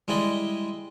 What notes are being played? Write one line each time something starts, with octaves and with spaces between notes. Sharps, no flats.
G3 G#3 E4 D5 D#5